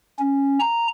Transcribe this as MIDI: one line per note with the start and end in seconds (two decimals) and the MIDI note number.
0.20 0.59 61
0.60 0.88 82